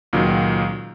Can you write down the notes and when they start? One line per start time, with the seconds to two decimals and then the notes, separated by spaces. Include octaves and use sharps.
0.13 C#2 A#2 D#3 F#3